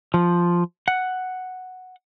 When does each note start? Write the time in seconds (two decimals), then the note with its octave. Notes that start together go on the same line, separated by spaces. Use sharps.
0.14 F3
0.88 F#5